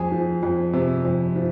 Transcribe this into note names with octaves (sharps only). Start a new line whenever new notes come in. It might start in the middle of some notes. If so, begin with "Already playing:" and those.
Already playing: F2 G#4
F3
F2
C3
F2
F3